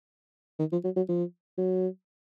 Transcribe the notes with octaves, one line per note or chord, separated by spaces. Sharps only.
D#3
F3
F#3
F#3
F3
F#3